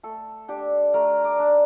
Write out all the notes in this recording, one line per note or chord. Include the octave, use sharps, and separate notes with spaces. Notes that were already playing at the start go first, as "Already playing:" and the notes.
A3 A4
D4 G4
A3 A#4
D5
D4